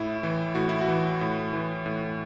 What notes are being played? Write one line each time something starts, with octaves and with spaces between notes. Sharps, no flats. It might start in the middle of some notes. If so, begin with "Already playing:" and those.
Already playing: A2 E4
E3
A2 F#4
E4
F#4
E3
A2
E3
A2